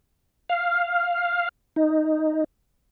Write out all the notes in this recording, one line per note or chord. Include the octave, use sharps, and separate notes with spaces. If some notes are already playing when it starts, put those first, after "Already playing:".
F5
D#4